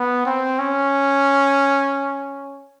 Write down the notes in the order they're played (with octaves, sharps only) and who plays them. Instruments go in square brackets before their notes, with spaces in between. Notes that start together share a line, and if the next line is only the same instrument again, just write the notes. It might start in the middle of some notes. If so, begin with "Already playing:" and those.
Already playing: [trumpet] B3
C4
C#4